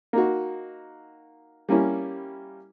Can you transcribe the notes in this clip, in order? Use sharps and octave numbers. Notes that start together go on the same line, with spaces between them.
A#3 D#4 F#4
G3 A#3 C#4 E4